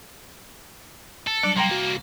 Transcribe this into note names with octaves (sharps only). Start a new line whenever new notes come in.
A4
F#3 G3 D4
C2 A#3 G5 A#5 C6
F#4